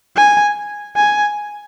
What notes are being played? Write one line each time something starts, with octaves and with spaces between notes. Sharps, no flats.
G#5
G#5